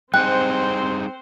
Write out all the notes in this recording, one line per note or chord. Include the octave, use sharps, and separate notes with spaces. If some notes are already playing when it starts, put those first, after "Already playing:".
G3 C4 D#4 G#4 C5 G5 F#6